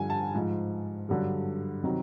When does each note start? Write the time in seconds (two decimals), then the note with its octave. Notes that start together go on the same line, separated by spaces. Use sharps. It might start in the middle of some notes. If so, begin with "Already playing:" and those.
Already playing: G2 D3 F3 G#5
0.10 A5
0.35 G#2 F3
1.09 G2 D3 F#3
1.84 C3 D#3 F#3